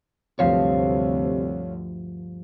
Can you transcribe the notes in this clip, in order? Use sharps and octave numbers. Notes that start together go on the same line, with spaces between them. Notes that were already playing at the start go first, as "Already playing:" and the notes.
D2 G2 C3 F3 C#5 F5